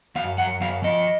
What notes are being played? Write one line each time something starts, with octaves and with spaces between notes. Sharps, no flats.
F#2 F5
F#2 F#5
F#2 F5
F3 D#5